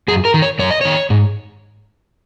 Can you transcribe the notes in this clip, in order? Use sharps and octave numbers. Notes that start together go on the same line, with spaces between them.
F#2 G#4
A#4
D#3
C#5
F#2 C#5
D#5
D#3 C#5
G#2